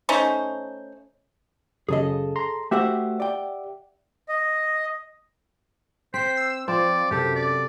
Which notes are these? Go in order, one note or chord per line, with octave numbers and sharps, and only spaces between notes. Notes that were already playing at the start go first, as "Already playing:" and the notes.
A3 C#4 D#4 C5
F#2 C#3 G#4 A4 D#5
A#5 C6
A3 F#4 G4 C5 E5 F#5
D5 G5
D#5
C4 C5 B6
E6
F3 C4 D5
F#2 C3 G4 A4
D5